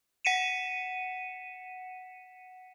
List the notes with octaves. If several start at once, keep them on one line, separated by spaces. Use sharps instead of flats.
F#5 B6 C#7 D#7 E7